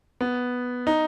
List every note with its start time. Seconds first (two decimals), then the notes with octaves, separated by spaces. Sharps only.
0.21 B3
0.87 D#4